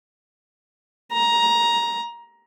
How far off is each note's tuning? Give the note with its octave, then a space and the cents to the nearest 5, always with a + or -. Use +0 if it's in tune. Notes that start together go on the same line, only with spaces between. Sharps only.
A#5 +15